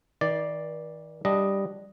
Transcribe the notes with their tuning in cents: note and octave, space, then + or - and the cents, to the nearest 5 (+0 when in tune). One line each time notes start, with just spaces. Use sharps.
D#3 +45 D5 +0
G3 +0 D4 +5 D#5 +0